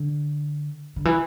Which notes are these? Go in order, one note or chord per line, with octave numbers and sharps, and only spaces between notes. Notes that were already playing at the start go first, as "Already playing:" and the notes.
Already playing: D3
D3
E3